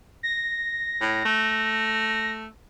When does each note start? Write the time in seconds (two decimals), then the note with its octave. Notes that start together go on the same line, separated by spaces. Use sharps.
0.23 A#6
1.01 A2
1.25 A3